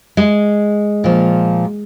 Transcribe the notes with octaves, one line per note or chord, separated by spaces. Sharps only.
G#3
A#2 F3